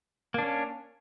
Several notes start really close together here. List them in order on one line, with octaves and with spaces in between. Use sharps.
A#3 D4 C#4